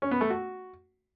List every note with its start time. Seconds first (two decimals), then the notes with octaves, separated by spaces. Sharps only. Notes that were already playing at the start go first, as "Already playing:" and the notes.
0.02 C#4
0.11 B3
0.21 A3
0.30 F#4